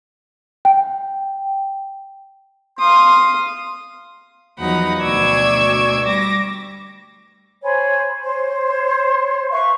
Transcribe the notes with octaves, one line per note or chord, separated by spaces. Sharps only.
G5
F5 C6 D#6
E2 F3 F#3 D#4 F#5 B5
D2 B2 D5 C#6 E6 G#6
G3 D6 A#6
C5 C#5 G#5 B5
C5 C#5
B4 E5 F5 C#6